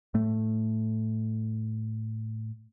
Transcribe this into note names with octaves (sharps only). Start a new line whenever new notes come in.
A2 A3